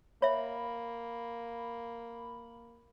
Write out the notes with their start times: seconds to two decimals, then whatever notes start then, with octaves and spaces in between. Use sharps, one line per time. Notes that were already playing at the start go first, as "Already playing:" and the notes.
0.22 A#3 C#5 E5 B5